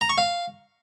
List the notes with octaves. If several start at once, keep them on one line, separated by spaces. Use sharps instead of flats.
A#5
C#6
F5